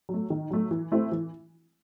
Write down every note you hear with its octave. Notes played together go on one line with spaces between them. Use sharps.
F#3 A3
D#3
F#3 A3
E3
A3 C4 E4
E3